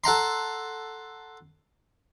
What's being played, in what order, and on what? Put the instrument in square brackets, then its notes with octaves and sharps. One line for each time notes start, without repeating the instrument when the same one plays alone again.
[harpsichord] A4 F#5 A#5 C6